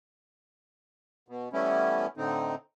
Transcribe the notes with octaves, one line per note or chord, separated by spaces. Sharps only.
B2
E3 G3 A3 B3 C#4 E4
A2 D3 C4 D#4